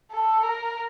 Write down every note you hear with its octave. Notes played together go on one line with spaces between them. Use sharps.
A4
A#4